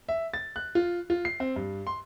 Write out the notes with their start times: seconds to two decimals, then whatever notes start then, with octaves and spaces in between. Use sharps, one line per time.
0.09 E5
0.34 A6
0.56 F#6
0.75 F4
1.10 F4
1.25 C7
1.40 C4
1.56 G2
1.87 C6